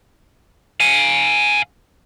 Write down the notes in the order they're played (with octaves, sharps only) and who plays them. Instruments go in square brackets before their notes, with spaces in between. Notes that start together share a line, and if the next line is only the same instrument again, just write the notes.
[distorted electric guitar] F5 G#5